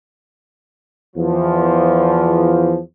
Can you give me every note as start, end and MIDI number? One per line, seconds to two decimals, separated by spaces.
1.16 2.79 40
1.16 2.79 53